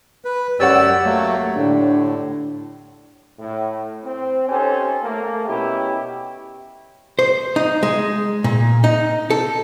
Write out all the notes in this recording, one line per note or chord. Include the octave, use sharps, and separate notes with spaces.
B4
F#2 G4 C#5 D5 F#5 E6
F#3 A3 A#3
A2 D3 D4
A2
C4
C#4 D#4 G4 A4 C5
A3 A#3
B2 C#4 E4 G4
C5
D#4
G#3
A#2
D#4
A4